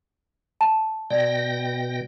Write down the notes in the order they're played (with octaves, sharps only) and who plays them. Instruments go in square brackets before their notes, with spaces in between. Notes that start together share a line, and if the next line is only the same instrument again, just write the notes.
[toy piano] A5
[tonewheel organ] B2 G5 A#6 [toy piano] D5